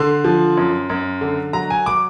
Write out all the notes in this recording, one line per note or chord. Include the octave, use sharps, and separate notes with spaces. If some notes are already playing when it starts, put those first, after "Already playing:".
Already playing: D3 C6
F3
F#2
F#2
D3
F#3 A#5
G#5
D6